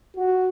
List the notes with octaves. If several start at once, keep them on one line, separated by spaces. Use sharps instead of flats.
F#4